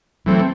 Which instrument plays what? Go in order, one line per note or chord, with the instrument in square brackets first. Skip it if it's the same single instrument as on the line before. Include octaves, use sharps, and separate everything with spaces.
[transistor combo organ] E3 A3 C4 [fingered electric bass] F#3